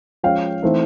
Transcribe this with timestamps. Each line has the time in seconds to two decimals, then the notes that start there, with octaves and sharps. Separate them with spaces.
0.23 F3 G#3 C#4 F5 G5
0.62 E3 A3 C4 D#4